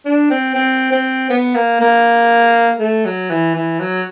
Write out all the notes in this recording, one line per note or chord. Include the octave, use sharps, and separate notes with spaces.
D4
C4
C4
C4
B3
A#3
A#3
A3
F#3
E3
E3
F#3